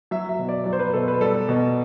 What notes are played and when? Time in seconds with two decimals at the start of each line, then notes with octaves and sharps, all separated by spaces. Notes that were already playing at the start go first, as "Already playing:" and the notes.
0.11 F#3 E5
0.29 E5
0.39 B2
0.49 D5
0.64 F#3 D5
0.73 C5
0.79 B4
0.93 B2 A4
1.08 B4
1.21 G3 A4
1.49 B2